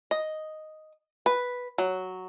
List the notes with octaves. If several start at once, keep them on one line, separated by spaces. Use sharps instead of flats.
D#5
B4
F#3